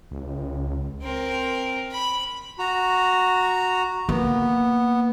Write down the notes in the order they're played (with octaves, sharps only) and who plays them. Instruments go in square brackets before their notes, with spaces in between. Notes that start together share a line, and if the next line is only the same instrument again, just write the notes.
[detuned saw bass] C#2
[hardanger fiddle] C4 A#4
B5
[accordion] F#4 A#5
[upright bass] A#3 [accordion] B3